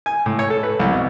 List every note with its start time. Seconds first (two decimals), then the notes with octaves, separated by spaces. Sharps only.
0.06 G#5
0.26 A2
0.39 C#5
0.50 A4
0.63 B4
0.79 C2
0.92 B2